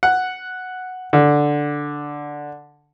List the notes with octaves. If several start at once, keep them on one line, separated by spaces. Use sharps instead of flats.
F#5
D3